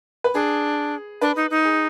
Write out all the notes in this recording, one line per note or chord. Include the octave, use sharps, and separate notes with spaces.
B4
D4 G#4
D4 B4
D#4
D#4
G#4